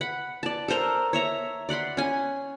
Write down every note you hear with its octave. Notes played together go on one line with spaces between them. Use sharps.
F#5 B5
D5 A5
A4 A#4 C5 A#5
C#5 E5 A#5
D5 F#5 B5 C6
C#4 G#5